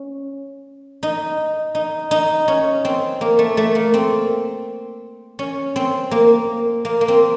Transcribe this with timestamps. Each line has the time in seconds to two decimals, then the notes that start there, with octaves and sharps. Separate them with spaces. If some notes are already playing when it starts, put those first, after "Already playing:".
Already playing: C#4
1.03 D#4
1.75 D#4
2.11 D#4
2.48 C#4
2.85 C4
3.21 A#3
3.39 A3
3.57 A3
3.75 A#3
3.94 C4
5.39 C#4
5.76 C4
6.11 A#3
6.85 A#3
7.01 A#3
7.08 C4